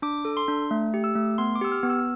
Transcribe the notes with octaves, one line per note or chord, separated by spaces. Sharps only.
D4 D6
A4
C6
D4
A3
G4
E6
A3
B3 C6
D6
G4 E6
F6
B3
E6